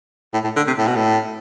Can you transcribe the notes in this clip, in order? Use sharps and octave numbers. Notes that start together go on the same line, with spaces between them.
A2
A2
D3
C3
A2
B2
A2